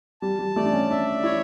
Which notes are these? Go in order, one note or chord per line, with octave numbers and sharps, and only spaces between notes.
G3 A5
G3
A3 D5
D4
C#4
D4 E5
E4 C#5